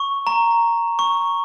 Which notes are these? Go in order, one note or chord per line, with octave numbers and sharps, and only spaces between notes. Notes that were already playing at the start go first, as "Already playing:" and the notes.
Already playing: C#6
A#5
C#6